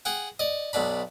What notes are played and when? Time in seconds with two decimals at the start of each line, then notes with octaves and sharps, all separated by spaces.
0.05 G#4 F#5 G5
0.39 D5 D#5
0.73 B1 B2 D4 B5